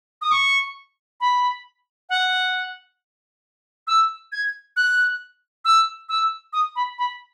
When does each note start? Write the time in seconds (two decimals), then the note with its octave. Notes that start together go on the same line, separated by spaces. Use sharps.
0.21 D#6
0.31 C#6
1.20 B5
2.09 F#5
3.87 E6
4.32 G#6
4.76 F#6
5.65 E6
6.09 E6
6.53 D#6
6.75 B5
6.98 B5